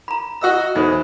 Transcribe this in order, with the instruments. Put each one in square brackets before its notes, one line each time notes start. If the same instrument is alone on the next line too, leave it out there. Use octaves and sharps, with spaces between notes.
[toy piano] A#5 B5
[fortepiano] F#4 D#5 E6
[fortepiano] E2 [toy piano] D#4 A4 C5